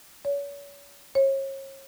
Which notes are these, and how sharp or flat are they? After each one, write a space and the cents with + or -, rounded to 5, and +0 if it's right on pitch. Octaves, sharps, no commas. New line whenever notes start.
C#5 +40
C#5 -35